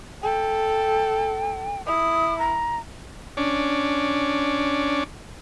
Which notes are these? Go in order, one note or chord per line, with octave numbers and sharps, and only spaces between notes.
A4 G5
E4 D#6
A#5
C#4 D4